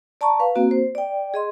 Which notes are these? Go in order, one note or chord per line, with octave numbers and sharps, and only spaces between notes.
D5 A5 A#5 C#6
B4 F5
A#3 C4 F#4
C5
D5 G5
G#4 D#5 C6